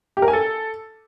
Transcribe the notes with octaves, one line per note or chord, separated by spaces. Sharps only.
G4
A#4
G#5
A4